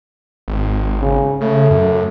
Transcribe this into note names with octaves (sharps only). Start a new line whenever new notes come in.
G#1
C#3
C#3 A3
F#2